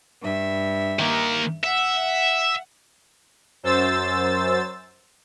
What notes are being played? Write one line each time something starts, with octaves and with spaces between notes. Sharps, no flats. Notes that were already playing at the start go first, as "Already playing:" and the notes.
G2 E5
D#3 A#3
E5 F#5
F#2 C5 E6 A6